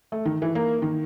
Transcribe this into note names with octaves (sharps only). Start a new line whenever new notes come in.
A3
D#3
E3
A#3
D#3